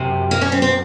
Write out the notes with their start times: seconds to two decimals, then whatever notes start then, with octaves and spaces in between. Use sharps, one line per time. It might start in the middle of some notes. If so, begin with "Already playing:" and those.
Already playing: F#2 C3
0.31 A#3
0.42 C#4
0.52 C4
0.62 C4